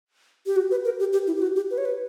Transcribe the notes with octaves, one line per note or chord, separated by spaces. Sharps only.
G4
F#4
B4
A#4
G4
G4
E4
G4
F#4
G4
B4
C#5
B4